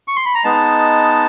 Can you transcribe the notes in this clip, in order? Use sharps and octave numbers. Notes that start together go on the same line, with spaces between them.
C#6
C6
B5
A#5
G#3 B3 D#4 A5